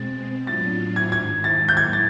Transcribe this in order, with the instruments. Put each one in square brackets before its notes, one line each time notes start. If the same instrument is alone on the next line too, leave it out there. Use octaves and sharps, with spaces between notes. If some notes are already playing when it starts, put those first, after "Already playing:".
Already playing: [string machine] B2 G#3 C4 [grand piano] A6
[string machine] A2 F#3 B3 D4 F4 [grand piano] A6
[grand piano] G#6
[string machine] G#2 D#3 G#3 [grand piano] G#6
[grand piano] A6
G6
[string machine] A2 F#3 A#3 [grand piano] G#6
[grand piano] A6